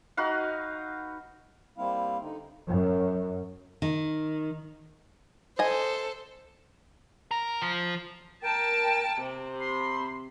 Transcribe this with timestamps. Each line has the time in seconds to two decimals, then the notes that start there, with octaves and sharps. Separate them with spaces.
0.17 D#4 F#4 B4 F5
1.78 G3 A#3 C4 E4 F5
2.22 D3 D#4
2.67 F#2
3.82 D#3
5.59 A4 C5 D#5 G#5
7.31 A#4
7.62 F3
8.43 A#4 G5 A5
9.20 C3
9.59 B5 C6